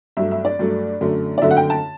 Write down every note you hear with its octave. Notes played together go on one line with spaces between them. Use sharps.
G2 F#3 A3 E5
E5
D5
G2 F#3 A3
F#2 D3 A3
D5
F#2 D3 A3 E5
F#5
G5
A5